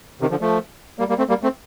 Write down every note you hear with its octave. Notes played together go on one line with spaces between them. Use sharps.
C3 D#3
D3 F3
F3 A3
G3 A#3
G3 A#3
A3 C4
G3 A#3
A3 C4